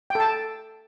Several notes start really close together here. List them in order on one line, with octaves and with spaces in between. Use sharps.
G5 A4 A5